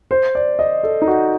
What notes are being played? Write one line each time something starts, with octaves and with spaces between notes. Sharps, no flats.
C5
D5
D#5
A4
D#4
F#4